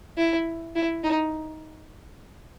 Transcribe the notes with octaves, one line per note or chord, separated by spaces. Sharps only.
E4
E4
D#4